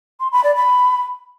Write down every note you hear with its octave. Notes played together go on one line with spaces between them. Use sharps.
C6
B5
D5
B5